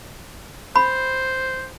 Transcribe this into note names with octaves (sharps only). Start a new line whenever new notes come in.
C5 B5